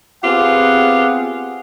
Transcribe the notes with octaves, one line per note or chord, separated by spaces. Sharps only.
B3 C4 F4 G4 G#4 F#5